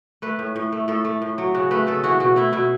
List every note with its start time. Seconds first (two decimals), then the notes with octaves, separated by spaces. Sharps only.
0.22 A3 B4
0.39 A2
0.56 A2
0.72 A3
0.88 A2 A4
1.05 A3
1.22 A2
1.38 F#3
1.54 C#3 F#4
1.71 A3 B4
1.87 C#3 A4
2.04 E3 F#4
2.20 B2 F#4
2.36 A3 E4
2.53 B2 E4